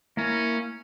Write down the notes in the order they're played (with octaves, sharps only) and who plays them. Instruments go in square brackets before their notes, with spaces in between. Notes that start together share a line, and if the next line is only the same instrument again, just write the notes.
[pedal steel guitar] A#3 E4 A#5 [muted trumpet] C#4